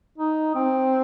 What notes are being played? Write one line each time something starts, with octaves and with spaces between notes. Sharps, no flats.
D#4
C4